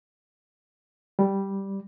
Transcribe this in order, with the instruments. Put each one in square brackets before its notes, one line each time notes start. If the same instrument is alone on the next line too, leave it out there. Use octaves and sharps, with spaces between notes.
[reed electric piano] G3